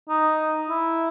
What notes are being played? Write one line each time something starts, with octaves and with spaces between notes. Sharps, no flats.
D#4
E4